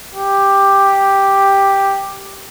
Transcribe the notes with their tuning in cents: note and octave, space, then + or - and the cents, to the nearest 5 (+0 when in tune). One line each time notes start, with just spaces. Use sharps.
G4 +5